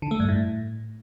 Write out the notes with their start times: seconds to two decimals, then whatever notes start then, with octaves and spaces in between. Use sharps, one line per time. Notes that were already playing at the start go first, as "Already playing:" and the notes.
0.02 D3
0.11 A3
0.20 G2
0.29 A2